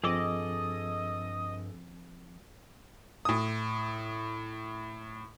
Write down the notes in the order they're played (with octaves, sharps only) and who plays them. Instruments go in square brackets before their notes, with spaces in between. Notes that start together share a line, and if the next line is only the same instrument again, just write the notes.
[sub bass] G2 [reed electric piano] F3 C4 [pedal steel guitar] G#4 A4 D6 [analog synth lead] D#5
[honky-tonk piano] A2 D#6